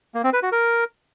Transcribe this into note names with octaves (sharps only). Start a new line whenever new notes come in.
A#3
C4
B4
F#4
A#4